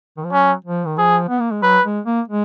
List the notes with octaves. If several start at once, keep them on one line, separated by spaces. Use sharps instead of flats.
D#3
F3
F#3 C#4
F3
D#3
F3 G#4
B3
A#3
G#3
F#3 B4
G#3
A#3
G#3